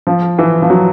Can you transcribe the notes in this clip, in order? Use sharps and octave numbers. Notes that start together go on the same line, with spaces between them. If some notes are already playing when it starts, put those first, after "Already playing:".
F3
E3
F3
F#3